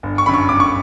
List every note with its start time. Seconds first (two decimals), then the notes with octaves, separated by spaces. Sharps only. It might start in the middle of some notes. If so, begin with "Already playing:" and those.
0.03 G1
0.18 C#6
0.26 F#2 D3 B5
0.34 C#6
0.49 G1 D6
0.60 C#6